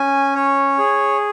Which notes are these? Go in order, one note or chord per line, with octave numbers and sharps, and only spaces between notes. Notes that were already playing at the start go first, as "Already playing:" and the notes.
Already playing: C#4 G#5
C#5
G#4